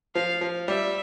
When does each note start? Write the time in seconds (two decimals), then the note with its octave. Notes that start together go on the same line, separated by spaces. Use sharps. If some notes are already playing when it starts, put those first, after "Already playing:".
0.15 F3 F5
0.41 F3
0.68 G3 E5